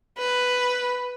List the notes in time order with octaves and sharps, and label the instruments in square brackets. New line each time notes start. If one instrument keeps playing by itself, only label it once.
[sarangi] B4